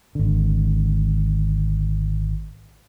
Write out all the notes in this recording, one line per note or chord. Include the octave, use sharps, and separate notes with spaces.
G#1 D3